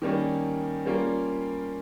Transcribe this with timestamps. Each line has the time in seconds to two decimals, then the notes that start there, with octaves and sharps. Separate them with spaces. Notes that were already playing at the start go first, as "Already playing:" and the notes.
0.02 D#3 G3 A#3 C#4
0.85 G3 A#3 C#4 F4 A#4